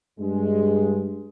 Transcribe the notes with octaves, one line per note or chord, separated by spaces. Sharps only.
G2 G#3